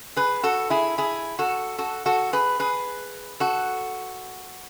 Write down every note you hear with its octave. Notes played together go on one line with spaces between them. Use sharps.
G#4 B4
F#4 A4
E4 G#4
E4 G#4
F#4 A4
F#4 A4
F#4 A4
G#4 B4
G#4 B4
F#4 A4